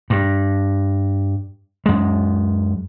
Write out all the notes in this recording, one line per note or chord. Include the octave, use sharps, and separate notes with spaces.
G2
F#2 G#3